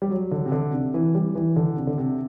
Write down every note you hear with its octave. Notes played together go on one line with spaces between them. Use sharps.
G3
F#3
D3
C3
D3
C3
E3
G3
E3
D3
C3
D3
C3